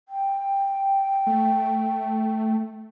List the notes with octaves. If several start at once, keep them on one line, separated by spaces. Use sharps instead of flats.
G5
A3